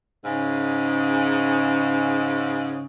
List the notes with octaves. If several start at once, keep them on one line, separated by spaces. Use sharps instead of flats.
G#2 C#3